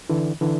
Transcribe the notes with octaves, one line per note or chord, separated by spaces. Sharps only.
D3 E3
D3 E3